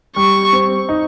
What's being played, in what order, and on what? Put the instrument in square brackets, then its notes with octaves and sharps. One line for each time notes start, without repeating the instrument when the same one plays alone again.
[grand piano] G3 [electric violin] C#6
[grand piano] C4
D#4